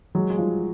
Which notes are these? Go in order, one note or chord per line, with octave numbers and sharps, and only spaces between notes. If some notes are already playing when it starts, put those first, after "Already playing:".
F#3 G#3
G#3
F3 G3